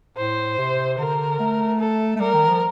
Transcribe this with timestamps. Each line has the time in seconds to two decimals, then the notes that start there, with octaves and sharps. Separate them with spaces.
0.17 A2 C5
0.58 C3
0.98 D3 A#4
1.39 A3
1.80 A4
2.16 A3
2.20 G3 A#4
2.34 D#3
2.47 F3